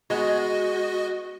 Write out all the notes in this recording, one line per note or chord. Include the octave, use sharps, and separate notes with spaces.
G#3 B3 F#4 D#5